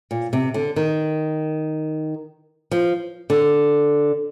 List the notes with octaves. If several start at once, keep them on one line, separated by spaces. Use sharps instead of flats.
A#2
C3
D3
D#3
F3
D3